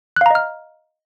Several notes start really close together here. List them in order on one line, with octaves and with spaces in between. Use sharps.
F#6 F5 A#5 D#5 F6